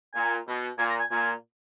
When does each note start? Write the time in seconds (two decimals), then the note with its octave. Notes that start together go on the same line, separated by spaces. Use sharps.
0.14 A#2 G#5
0.47 B2
0.78 A#2 G#5
0.89 A#5
1.00 G#5
1.10 A#2 G#5